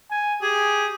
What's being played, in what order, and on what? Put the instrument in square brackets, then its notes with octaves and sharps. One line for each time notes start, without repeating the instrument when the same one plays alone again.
[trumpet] G#5
[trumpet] G4 [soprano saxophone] G#4